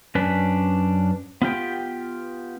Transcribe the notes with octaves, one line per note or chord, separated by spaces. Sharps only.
F#2 C#4 D4 B4
B3 F4 G4 G5